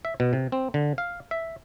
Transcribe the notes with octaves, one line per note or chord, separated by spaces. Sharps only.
E5
B2
C3
C4
D3
F5
E5